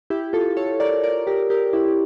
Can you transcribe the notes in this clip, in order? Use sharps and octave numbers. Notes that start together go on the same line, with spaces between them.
E4 G4
F4 A4
A4 C#5
A#4 D5
A#4 D5
G4 A#4
G4 A#4
E4 G4